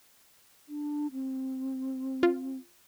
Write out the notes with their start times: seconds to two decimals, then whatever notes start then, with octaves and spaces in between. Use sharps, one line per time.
0.69 D4
1.12 C4
2.23 F4